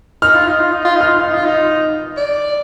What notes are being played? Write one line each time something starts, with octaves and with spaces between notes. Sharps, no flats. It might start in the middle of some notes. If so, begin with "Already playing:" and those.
D#4 F6
F4
D#4
F4
D#4
F4
D#4 F6
F4
D#4
F4
D#4
D5